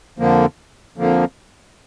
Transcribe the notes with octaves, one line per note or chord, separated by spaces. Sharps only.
F2 D3 F3 A#3
F2 D3 F3 A#3